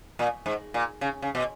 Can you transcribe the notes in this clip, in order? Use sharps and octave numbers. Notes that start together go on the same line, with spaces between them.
A#2
G#2
A#2
C#3
C#3
B2